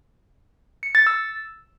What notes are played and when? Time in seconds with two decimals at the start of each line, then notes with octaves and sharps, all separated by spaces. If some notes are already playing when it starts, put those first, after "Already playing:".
0.83 C#7
0.95 A6
1.07 E6